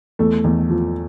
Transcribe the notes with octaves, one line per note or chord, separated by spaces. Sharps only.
E2 A3
E2
F3